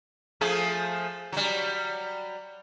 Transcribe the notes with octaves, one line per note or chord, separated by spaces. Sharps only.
F3 A3 G#4
F#3 G3